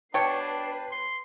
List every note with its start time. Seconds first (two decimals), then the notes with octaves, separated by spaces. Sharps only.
0.14 B2 D4 B4 C#5 G5 A5 C7
0.91 C6